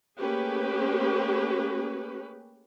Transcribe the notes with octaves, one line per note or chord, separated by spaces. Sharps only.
A3 A#3 C#4 G4 G#4 B4